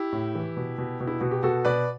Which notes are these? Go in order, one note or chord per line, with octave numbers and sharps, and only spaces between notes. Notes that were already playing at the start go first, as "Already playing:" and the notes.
Already playing: E4 G4
A2
E3
B2
B2
B2
E4
B2 F#4
G4
B2 F#4 A4
B2 B4 D5